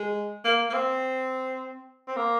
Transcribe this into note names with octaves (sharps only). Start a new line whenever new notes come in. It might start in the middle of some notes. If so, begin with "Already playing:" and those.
Already playing: G#3
A#3
A#3
C4
C4
A#3